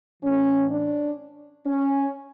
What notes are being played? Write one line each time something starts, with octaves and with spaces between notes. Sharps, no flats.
A2 E3 C#4
D4
C#4